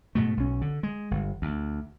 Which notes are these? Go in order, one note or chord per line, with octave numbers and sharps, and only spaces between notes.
G#2 B2 A3
B1 C#4
D3
G#3
G1
D2